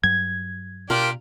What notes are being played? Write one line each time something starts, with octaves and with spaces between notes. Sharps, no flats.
G2 F#3 G#6
B2 D4 F4 G4 A#4 D5